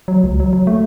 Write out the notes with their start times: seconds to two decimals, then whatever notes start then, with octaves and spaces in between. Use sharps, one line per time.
0.08 F#3
0.24 C#2
0.40 F#3
0.53 F#3
0.67 A3